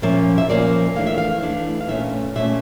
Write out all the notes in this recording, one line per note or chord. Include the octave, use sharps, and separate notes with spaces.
A#2 F3 A#3 C#4 E5
E5
A#2 F3 A#3 C#4 D5
E3 A3 D4 F5
E5
F5
E3 A3 D4
F5
A#2 A3 C#4 E5
A#2 A3 C#4 E5